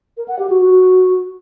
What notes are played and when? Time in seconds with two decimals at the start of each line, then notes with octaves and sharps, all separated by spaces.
0.17 A#4
0.28 F#5
0.39 G4
0.50 F#4
0.60 F#4